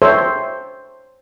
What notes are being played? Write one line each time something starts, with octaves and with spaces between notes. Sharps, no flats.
A4 C5 C#5 E5